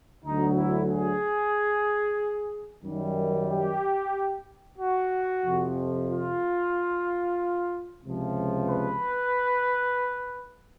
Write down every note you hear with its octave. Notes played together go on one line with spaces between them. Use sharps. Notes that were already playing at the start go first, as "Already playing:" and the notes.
D2 D3 F#3 D#4
E4
G#4
F#2 D#3 G3
G4
F#4
F2 C3 F3
F4
C#2 C3 F3
B4